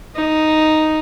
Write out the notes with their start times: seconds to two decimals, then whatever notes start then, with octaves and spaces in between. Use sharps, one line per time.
0.15 D#4